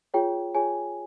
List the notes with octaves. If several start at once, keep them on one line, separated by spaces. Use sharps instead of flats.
F4 G#4 C#5 G5
F4 G#4 C#5 G#5